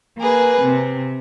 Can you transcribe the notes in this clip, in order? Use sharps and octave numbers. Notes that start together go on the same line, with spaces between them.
A#3 G#4 B4
C3